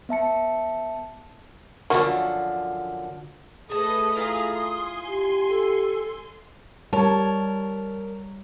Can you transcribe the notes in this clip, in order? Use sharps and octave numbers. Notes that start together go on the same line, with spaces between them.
B3 E5 A5 C#7
F#2 D3 F3 A#3 F#4
A3 G#4 A4 B4 D#5 A5 D#6
E4 F4 G#4 F5 A#5 C6
G#5 C6
G4
A4
G3 A#4 C#5 A5